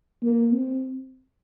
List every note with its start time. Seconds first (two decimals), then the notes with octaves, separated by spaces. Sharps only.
0.23 A#3
0.52 C4